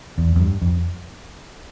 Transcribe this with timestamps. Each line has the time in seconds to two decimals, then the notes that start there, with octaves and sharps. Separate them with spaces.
0.18 E2
0.36 F2
0.40 G2
0.61 F2